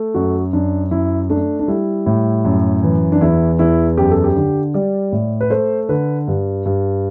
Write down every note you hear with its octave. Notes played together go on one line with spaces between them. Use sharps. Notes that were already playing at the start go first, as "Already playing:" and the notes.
Already playing: A3
F#2 F#4
F#2 D4
F#2 E4
A3 D4
D4
G3 E4
A2
F#2
E3
D4
E2 E4
E2 E4
F#2 G4
A4
G4
D3
G3 D5
A2
B4
A3 C5
D3 B4
G2
G2